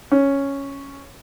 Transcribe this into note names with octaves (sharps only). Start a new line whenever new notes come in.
C#4